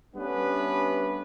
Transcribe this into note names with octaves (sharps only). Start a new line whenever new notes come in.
G3 A3 B3 C#4 D4 B4